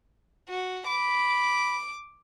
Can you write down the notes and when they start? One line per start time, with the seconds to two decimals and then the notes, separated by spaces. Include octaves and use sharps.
0.49 F#4
0.87 B5 D6